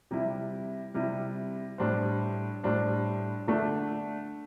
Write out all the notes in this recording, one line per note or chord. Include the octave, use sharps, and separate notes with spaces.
C3 G3 E4
C3 G3 E4
A2 G3 D4 C5
A2 G3 D4 C5
D3 A3 D4